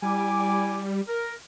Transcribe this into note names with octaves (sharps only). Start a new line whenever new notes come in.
G3 E4 G#5 D6
A#4